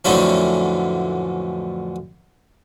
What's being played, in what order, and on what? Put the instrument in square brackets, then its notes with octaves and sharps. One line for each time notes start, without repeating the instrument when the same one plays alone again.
[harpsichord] F2 A2 D3 E3 F#3 C#4